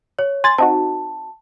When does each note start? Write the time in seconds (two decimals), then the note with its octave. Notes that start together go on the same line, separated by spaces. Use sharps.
0.19 C#5
0.44 G#5 C6 A6
0.58 C4 D#4 F#4 A5